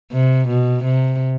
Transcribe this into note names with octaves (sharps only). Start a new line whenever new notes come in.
C3
B2
C3